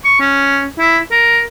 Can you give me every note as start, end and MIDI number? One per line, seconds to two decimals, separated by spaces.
0.05 0.19 85
0.20 0.65 61
0.79 0.99 64
1.11 1.42 70